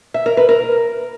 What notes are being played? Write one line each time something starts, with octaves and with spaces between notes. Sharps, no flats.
E5
A#4
B4
A#4